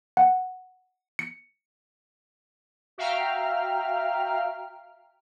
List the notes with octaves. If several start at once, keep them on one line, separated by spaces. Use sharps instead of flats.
F#5
C#7
F#4 E5 F5 G5 A#5 F6